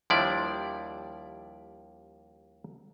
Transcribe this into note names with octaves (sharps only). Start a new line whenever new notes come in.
D#2 F3 G3 D4 E4 D5